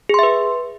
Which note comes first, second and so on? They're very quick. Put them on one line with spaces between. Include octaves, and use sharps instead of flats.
G#4 C6 E5 B4